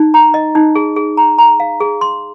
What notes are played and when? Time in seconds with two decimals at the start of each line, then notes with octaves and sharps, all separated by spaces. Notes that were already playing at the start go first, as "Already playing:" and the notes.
Already playing: D#4
0.14 A#5
0.34 D#5
0.55 D#4
0.75 G#4
0.96 G#4
1.17 A#5
1.38 A#5
1.60 F5
1.80 G#4
2.01 C6